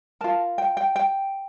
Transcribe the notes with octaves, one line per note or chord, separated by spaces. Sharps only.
F4 A#4 A5
G5
G5
G5